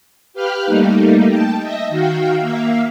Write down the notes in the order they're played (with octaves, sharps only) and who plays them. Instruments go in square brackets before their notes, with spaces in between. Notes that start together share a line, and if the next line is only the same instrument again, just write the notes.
[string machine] G4 B4 F5 G5 F6 F#6
G3 A3 A#3 D#4
G5 A5
D#5 E5 A#6
D#3 F#4 F5 G5
A#3 E5 F5